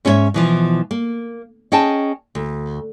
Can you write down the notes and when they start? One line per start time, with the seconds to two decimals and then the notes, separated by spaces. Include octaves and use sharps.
0.05 G#2 C#4 E4 A4 C#5 E5
0.34 B2 E3 F3
0.91 A#3
1.72 C#4 G#4 D#5 G5 A5
2.35 D2